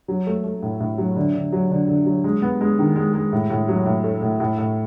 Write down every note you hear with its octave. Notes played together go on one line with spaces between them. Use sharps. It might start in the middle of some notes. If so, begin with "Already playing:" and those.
F#3
A3
A3
A2
A2
F#3
D3
D3
F#3
D3
D3
F#3
G#3
B3
G#3
D#3
G#3
G#3
A2
A2
F#3
A2
A3
A2
A2
A2